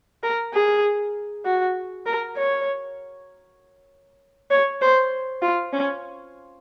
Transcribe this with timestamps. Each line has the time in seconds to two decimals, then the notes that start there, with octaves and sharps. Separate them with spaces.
0.23 A#4
0.54 G#4
1.45 F#4
2.06 A#4
2.37 C#5
4.51 C#5
4.82 C5
5.42 F4
5.73 C#4